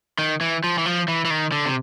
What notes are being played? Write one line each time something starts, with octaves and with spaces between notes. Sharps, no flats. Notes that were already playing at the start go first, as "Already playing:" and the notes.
D#3
E3
F3
E3
F3
E3
E3
D#3
D3
C3